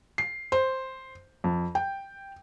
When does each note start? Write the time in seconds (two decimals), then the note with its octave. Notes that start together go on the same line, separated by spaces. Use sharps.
0.18 C7
0.52 C5
1.44 F2
1.75 G5